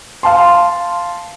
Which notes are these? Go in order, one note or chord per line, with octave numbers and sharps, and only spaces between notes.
F5 A5 C6